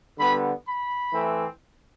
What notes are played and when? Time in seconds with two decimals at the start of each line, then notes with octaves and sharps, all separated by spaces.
0.18 D3 G3 B3 B5
0.66 B5
1.12 E3 A3 C4